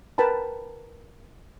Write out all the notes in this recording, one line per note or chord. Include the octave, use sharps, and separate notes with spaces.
A#4 B4 G5 A5 B5